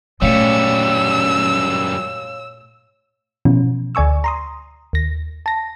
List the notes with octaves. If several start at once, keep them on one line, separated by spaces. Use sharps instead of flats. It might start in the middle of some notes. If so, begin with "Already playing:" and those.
F#2 A#2 G3 A3 C#5 F5 E6 C#7
B2 E3 F3 C#4
D2 D5 G#5 C#6 E6
A#5 C6 D#6
D#2 A#6
A5 A#6